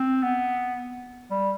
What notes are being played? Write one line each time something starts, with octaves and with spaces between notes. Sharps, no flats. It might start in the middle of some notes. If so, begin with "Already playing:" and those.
Already playing: C4
B3
G3